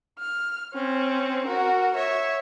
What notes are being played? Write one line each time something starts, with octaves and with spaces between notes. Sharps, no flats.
F6
C4 C#4
F#4 A#4
C#5 E5